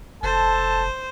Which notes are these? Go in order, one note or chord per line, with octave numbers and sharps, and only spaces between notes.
F1 A4 C5 A5